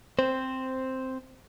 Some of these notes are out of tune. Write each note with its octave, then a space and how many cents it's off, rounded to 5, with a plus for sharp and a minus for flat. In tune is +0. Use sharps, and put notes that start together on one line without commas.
C4 +0 C5 +0